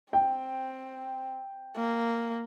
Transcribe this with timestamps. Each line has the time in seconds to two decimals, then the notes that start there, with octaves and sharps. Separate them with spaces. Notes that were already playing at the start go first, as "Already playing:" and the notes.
0.13 C4 G5
1.76 A#3